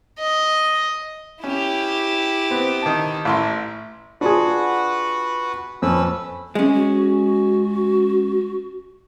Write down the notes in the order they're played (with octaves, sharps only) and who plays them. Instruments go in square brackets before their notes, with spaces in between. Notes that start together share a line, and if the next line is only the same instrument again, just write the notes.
[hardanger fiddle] D#5
[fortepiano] C#4 [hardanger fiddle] E4 G4
[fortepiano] B3 C4
D#3 A5
A1 E4 C6
[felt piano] D4 F4 G#4 [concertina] F#4 B4 F#5
[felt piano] F2 [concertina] C#4 B4 E6
[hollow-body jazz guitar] G#3 C#4
[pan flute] F#4